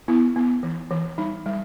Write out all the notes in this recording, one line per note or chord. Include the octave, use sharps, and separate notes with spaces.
B3 E4
B3
E3
E3
G3 D#4
G3